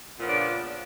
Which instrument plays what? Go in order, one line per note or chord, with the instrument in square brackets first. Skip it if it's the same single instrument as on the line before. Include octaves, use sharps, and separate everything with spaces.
[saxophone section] A#2
F3
B3
C#3
D4